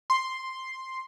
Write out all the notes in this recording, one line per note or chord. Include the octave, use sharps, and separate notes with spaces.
C6